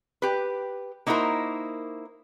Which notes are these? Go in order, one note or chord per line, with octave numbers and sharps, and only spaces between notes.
G4 B4
A#3 D#4 E4 F#4 A#4 C5